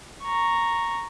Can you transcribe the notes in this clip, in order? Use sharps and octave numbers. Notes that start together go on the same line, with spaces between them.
A#5 C#6